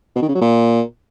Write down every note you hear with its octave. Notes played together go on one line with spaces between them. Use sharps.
B2
D#3
C#3
F#3
A#2